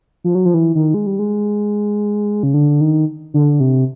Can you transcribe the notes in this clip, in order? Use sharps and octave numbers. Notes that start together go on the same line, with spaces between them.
F3
F#3
F3
E3
D#3
G#3
G3
G#3
C#3
D3
D#3
D3
C3